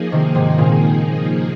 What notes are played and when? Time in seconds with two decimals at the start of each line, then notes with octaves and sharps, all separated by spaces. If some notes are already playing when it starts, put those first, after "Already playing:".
Already playing: F3 A#3 D#4 G#4
0.12 C3 D#3
0.35 G#2 C3
0.58 A#2 C#3